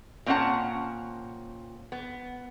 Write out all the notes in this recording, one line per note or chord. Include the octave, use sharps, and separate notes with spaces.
A#2 C4 C#4 E4 F#5 A5
B3